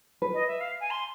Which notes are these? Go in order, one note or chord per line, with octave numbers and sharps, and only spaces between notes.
B4
D#5
E5
F5
G#5
C6